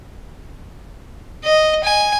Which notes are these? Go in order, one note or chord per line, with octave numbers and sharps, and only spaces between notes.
D#5
G#5